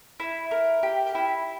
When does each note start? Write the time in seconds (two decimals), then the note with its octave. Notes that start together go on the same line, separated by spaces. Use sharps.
0.20 E4
0.51 A#4
0.83 G4
1.15 E4